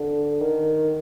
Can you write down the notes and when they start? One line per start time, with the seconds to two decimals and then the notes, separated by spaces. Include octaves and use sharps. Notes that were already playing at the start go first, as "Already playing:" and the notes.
Already playing: D3
0.42 D#3